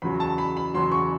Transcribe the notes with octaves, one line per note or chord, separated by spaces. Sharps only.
E2 C#3 F#3 B5
A5
B5
B5
E2 C#3 F#3 C6
C#6